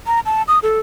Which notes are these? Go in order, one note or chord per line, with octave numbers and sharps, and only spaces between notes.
A#5
A5
D#6
A4